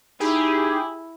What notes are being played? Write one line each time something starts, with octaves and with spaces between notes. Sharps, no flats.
D#4 E4 G4 G#4